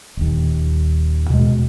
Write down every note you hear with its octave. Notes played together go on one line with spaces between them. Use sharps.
D#1 D#2
B2 G#3